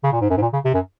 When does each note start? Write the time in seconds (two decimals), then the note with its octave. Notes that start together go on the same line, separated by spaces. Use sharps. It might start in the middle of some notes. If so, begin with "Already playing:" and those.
0.04 C#3
0.13 A#2
0.21 G#2
0.30 F#2
0.37 G#2
0.42 A#2
0.53 C#3
0.65 C3
0.74 F#2